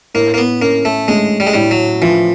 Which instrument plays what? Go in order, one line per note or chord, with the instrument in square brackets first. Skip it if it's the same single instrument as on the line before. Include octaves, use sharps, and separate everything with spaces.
[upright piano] A2 [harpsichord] A#3
[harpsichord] A#3
B3
[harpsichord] A#3 [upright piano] C#4
[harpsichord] A3
[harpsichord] G#3 [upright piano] A3
[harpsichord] G3
G#3
[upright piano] A2 [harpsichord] G3
[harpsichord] F#3
[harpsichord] E3 [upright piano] F3